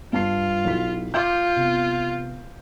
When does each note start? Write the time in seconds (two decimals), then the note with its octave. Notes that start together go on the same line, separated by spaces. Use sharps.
0.13 G2 F4 A5 C7
0.65 B1 E4 B6
1.14 F4 C6 D6 G6
1.56 C3 B3